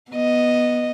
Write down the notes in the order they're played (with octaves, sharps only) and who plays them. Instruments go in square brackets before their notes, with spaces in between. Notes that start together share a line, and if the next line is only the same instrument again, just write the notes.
[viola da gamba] B3 D#5